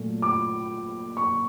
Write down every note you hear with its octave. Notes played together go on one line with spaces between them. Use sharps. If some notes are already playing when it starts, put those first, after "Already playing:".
Already playing: A#2 F#3 A3
D6
C#6